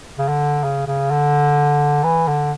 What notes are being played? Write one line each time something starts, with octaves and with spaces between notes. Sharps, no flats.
C#3
D3
C#3
C#3
D3
E3
D3